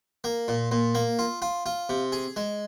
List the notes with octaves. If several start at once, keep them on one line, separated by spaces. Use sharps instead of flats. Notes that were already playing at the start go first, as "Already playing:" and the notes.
A#3
A#2
A#2
A#3
F4
F4
F4
C3
G#4
G#3